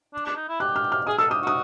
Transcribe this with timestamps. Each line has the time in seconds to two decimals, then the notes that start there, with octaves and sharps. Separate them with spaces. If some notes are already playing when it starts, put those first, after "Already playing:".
0.13 D4
0.26 D4
0.36 D#4
0.49 E4
0.60 G4 F#6
0.76 F6
0.92 F6
1.07 G#4 D#6
1.18 A4 E6
1.30 G4 D#6
1.42 F#4
1.47 D#6